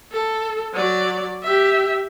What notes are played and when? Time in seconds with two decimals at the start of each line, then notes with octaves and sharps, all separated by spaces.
0.12 A4
0.73 F#3 D5
1.43 G4 E5